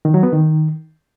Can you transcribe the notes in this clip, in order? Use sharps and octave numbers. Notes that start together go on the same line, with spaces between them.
D#3
F#3
B3
D#3